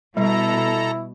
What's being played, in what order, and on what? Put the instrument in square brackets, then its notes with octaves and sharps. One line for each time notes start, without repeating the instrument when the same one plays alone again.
[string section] B2 [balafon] G3 [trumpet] E4 [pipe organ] A4 A#5